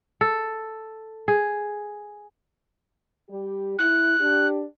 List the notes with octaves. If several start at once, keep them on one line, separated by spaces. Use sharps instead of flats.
A4
G#4
G3 G4
E4 F#6
D4 G4